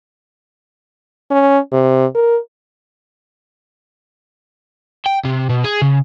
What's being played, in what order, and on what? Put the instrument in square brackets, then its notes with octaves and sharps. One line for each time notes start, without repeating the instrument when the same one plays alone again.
[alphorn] C#4
C3
A#4
[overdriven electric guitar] G5
C3
B2
G#4
C#3